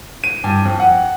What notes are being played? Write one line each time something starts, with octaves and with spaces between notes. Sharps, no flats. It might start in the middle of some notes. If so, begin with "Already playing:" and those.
D#7
G2
F2
F#5